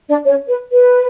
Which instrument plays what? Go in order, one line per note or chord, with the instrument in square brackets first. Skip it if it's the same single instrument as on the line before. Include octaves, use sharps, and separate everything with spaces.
[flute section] D4 D5
C#4 C#5
B4
B4